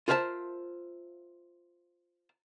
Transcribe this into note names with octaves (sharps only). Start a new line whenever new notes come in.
F4 A#4 C5 E5 G#5 A5